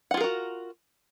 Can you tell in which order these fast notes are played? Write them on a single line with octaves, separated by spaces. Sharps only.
F#5 F4 G#4 A#4 F#4